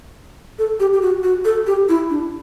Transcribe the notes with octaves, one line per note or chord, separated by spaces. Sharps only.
A4
G4
G4
F#4
F#4
A4
G4
E4
D4